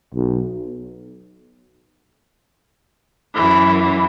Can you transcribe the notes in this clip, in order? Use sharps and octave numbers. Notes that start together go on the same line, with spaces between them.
B1
F#2 E3